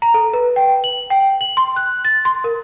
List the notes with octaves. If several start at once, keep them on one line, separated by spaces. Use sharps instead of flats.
A#5
A4
B4
G5
F#7
G5
F#7
C6
F#6
A6
C6
A#4